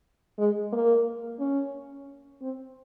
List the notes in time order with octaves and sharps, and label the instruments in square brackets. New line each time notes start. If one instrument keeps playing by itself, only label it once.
[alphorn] G#3
A#3
C#4
C4